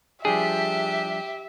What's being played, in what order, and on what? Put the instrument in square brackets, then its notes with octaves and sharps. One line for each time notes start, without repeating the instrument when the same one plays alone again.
[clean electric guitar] F3 G3 D4 [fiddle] G4 [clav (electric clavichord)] G#4 [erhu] E5